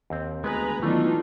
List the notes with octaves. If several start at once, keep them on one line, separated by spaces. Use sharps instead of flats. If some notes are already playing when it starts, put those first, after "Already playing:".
D#2 C4
D2 G#3 B3 B4 G#5 A#5
D#3 E3 F#3 A3 B3 D4 D#4 F4